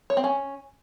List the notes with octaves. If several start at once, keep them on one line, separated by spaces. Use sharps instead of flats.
C#5
C4
C#4